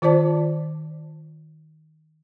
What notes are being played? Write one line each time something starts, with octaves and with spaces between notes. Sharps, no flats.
D#3 F4 C5 D5 A5